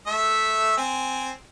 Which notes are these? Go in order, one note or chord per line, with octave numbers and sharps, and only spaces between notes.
A3 E5
C4 G#5